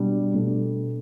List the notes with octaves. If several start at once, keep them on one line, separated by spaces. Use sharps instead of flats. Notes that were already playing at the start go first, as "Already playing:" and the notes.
Already playing: B2 G3 D4
B2 A3 D4